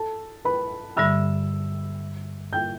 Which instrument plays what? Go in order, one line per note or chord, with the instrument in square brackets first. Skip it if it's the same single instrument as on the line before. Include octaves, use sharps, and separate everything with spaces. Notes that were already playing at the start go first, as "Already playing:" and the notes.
Already playing: [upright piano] A4 A5
B4 B5
[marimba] G2 D3 G3 [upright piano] E5 E6
[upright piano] G5 G6